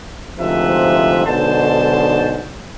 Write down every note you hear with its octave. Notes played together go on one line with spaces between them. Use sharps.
D2 G#2 C3 F3 B4 E5
B1 G#2 B2 D3 C5 A5